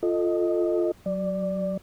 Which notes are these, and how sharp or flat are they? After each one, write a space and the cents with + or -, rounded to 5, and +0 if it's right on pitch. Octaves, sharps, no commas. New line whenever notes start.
F4 +0 A4 +0 D#5 -5
F#3 +10 D5 +0